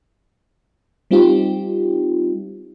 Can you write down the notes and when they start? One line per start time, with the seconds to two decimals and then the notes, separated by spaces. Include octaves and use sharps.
1.11 G3 C4 D#4 F4 G4